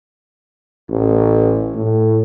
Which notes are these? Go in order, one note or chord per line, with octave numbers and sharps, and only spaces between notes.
A1
A2